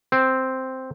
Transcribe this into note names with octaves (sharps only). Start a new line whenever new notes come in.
C4